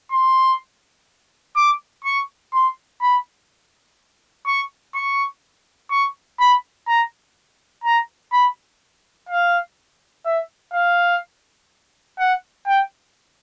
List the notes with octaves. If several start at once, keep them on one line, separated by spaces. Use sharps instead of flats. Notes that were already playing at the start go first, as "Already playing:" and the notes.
C6
D6
C#6
C6
B5
C#6
C#6
C#6
B5
A#5
A#5
B5
F5
E5
F5
F#5
G5